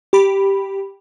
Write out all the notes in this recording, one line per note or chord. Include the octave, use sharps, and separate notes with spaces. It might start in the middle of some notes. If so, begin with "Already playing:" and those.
G4 B5